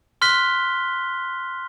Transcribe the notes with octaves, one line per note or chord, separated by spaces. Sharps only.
C6 F6 F#6 B6 G7